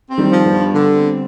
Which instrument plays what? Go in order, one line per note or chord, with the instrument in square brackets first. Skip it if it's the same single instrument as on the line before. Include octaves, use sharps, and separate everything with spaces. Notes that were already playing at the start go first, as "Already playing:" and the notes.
[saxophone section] C4
[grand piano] D#3 G3
[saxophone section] F3
[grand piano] G3 B3
[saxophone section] G2
D3
C4